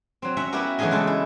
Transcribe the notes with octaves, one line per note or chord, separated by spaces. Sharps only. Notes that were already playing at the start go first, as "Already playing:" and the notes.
F#3 C4
C#4 E5 F#5 A#5
B3 E4 F#4 G4 A#4
E3 F#3 A3 D#4 G#4 D#5
C#3 G#3 A4 A5
E4